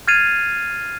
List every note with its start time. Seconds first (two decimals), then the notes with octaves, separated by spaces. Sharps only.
0.07 F6 G#6 A6 C7 D#7 F7